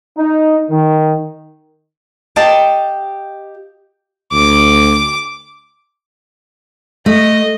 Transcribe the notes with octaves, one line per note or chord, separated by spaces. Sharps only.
D#4
D#3
G4 D#5 F5 G5 A5
D2 D6
A3 D#5